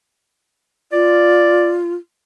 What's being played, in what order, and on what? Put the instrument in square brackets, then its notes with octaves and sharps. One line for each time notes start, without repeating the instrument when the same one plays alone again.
[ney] F4 [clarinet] D5